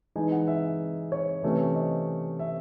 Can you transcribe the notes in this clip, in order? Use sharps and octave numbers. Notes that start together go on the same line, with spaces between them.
E3 G#3 D#4 G#5
F#5
E5
C#5
C3 E3 A3 C#4
D#5
E5